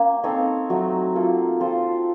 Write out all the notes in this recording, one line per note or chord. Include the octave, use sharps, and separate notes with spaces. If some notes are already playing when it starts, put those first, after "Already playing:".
Already playing: A#3 C#4
C4 D#4 A4 C#5
F#3 A3 D#4
A#3 F4 A4
C4 F4 A4 C5